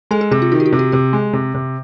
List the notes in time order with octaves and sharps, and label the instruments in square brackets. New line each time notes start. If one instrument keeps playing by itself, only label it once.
[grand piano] G#3 [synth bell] A4
[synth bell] G#4
[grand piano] C3 [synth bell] G#4
[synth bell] F4
[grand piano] D#3 [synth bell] F#4
[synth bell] G4
F#4
[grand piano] C3
[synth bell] G4
[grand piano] C3 [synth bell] G4
[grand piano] G#3
C3
C3